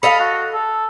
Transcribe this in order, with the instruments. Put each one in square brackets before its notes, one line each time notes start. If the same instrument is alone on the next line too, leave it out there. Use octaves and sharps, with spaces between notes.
[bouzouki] A4 D#5 F5 [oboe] B5
[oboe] F#4
A4